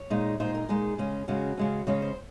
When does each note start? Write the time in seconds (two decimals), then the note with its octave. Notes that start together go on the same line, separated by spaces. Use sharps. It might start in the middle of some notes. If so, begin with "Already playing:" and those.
Already playing: C#5
0.10 A#2 G#3 D#4
0.40 A#2 G#3 D#4 C5
0.55 A#4
0.69 A#2 G#3 D#4 G#4
0.98 C#3 G#3 C#4
1.28 C#3 G#3 C#4 F#4
1.58 C#3 G#3 C#4
1.87 C#3 G#3 C#4 C#5
2.02 C5